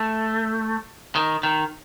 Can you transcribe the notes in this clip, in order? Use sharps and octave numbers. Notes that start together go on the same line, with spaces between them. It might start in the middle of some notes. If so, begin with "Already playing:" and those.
Already playing: A3
D#3
D#3